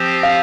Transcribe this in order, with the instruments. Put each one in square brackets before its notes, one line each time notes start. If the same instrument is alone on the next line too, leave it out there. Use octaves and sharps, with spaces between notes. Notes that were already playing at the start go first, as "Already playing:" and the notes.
Already playing: [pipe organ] F3 C4 G4 C5
[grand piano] F5